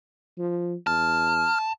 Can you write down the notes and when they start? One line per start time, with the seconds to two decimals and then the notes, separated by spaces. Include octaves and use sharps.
0.38 F3
0.87 E2 A5 F6